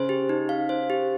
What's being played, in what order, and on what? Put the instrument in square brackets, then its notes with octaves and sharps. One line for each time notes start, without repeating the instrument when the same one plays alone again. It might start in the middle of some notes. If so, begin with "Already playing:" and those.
Already playing: [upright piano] C#3 [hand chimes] C5
[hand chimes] G4
D#4
F5
C5
G4